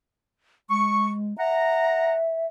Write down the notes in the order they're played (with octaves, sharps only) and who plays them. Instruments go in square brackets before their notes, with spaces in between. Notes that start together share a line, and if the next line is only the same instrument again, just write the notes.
[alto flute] G#3 [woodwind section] C#6
[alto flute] E5 [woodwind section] F#5 A#5